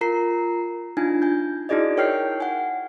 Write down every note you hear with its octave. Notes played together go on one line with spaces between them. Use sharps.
F4 A#4 A#5 C7
D4 D#4 F4 G#5
G#5 G6
D#4 E4 F#4 G#4 D5 D#5
A#4 C#5 G5 F6 G6 C7
F#5 G#5